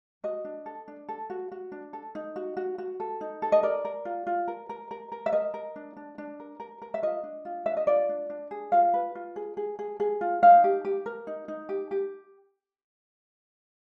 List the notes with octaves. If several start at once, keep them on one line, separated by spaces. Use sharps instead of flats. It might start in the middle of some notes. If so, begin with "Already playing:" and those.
F#4 D#5
D4
A4
D4
A4
F#4
F#4
D4
A4
D#4
F#4
F#4
F#4
A4
D#4
A4
D#5
A#4 D5
A#4
F4
F4
A#4
A#4
A#4
A#4
E5
A#4 D#5
A#4
D4
D4
D4
A#4
A#4
A#4
E5
F4 D#5
D4
F4
D4 E5
D#5
F4 D5
D4
D4
G#4
F4 F5
B4
F4
G#4
G#4
G#4
G#4
F4
D#4 F5
G4
G4
A#4
D#4
D#4
G4
G4